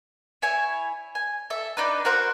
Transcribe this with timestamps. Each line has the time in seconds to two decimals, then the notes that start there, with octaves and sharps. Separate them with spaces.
0.42 E4 C#5 G#5
1.15 G#5
1.50 A4 E5
1.77 D4 D#4 B4
2.05 F#4 A#4 C5 F#5